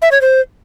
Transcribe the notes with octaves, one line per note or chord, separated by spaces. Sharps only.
E5
C#5
C5